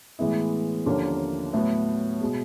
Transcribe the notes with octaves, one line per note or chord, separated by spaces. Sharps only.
A2 E3 G#3 B3 E4
D#2 D3 F3 A#3 C#4
A2 F#3 B3
B2 G#3